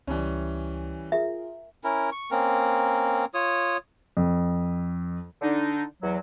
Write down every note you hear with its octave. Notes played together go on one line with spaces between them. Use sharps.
C#2 E3 G3 C#4
F4 G#4 A#4 E5
C#4 E4 A#4
C#6
A#3 C4 C#4 A#4
F4 C#5 D#6
F2
D3 D4 D#4
E2 F#3